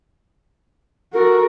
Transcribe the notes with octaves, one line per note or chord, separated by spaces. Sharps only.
F#4 A4 A#4